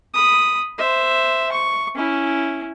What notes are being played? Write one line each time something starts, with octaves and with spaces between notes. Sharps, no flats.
B5 D#6
C5 E5
C#6
C#4 E4